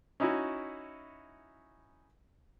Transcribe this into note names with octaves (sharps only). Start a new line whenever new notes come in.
C#4 D#4 E4 F#4